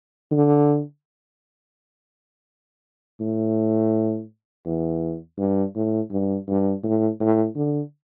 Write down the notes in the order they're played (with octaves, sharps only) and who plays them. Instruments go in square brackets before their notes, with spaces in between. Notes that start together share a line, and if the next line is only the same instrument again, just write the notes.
[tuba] D3
A2
E2
G2
A2
G2
G2
A2
A2
D3